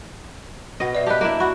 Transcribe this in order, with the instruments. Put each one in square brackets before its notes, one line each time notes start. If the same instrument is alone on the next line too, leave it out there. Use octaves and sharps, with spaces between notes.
[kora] B2 D#5 [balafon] B4 F#5
[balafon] B4 D5 E5
[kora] G4 B4 [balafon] D#5 A5
[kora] A#3 D4 E4
[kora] F#4 [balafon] B5